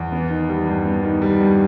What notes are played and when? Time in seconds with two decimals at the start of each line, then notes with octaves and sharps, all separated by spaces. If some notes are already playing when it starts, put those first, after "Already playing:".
Already playing: E2
0.12 B3
0.30 D#3
0.49 G3
0.67 G2
0.85 B3
1.03 D#3
1.22 G3
1.40 G2